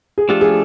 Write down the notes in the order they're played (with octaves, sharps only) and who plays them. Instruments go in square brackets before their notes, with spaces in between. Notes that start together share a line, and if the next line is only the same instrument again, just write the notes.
[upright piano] G#4
[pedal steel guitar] F3 A3 D4 F4 A4 [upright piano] G4
[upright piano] G#4